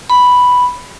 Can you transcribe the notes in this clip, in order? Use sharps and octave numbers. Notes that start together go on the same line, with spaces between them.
B5